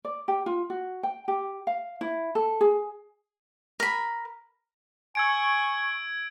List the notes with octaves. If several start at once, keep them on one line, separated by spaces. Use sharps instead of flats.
D5
G4
F4
F#4
G5
G4
F5
E4
A4
G#4
A#4 B5
G#5 C#6 E6 G#6 D7